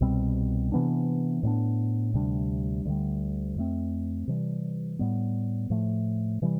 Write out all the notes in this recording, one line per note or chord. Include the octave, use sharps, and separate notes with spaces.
C2 B2 G3 C4
C3 E3 B3 D4
A2 G3 B3 D4
D2 C3 G3 D4
D2 D3 G3
F2 E3 A3 C4
C3 E3 G3
A2 G3 B3
A2 F3 A3
C3 E3 G3